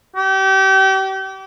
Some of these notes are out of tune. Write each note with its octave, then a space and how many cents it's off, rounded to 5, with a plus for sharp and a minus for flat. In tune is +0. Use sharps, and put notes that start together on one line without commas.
G4 -35